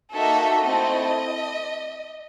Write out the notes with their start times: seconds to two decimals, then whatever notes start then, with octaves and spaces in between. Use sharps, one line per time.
0.14 A#3 D#4 F#4 A4 E5
0.62 A3 C4 E4 A4 D#5